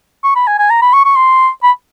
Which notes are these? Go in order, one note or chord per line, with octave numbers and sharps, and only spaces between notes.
C#6
B5
G#5
G#5
A#5
B5
C#6
C#6
C6
B5